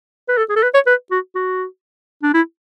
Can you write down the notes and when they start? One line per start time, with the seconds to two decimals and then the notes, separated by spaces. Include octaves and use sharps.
0.28 B4
0.38 A4
0.49 G#4
0.56 A4
0.63 B4
0.74 C#5
0.86 B4
1.11 F#4
1.35 F#4
2.23 D4
2.34 E4